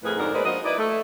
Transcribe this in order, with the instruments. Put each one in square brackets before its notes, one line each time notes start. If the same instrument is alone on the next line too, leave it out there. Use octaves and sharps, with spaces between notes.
[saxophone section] F2 A2 G#4 A#4 B4
F2 G#2 D3 D4 F#4 A#4
G#3 A#3 B3 B4 C5 D5
F3 A#3 D4 F#4 D#5
D#4 E4 B4 D5 D#5
A3